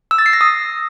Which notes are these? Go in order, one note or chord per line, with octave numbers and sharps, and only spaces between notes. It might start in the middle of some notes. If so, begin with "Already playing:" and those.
E6
A6
C7
A#6
D#6